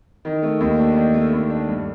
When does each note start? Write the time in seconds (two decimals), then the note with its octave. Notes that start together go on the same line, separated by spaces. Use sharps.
0.25 D#3
0.43 A3
0.60 D#2
0.79 D4
0.96 D#3
1.14 A3
1.33 D#2
1.50 D4
1.68 G2